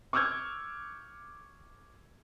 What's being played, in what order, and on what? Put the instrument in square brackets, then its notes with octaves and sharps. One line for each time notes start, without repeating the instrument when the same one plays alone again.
[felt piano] C#6 D6 E6 F6 G6 G#6